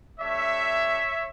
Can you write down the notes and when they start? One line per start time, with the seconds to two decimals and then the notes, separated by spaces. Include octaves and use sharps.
0.19 A3 D4 G4 C#5 E5